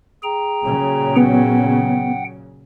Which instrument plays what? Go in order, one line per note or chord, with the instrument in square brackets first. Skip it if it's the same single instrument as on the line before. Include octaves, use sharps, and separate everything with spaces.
[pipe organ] G#4 G5 A#5
[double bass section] A#2 C#3 F#3
[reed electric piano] B3 [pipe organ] F#5 G5